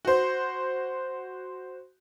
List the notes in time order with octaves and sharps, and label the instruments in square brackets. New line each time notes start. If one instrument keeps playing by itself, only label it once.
[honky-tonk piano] F#4 C5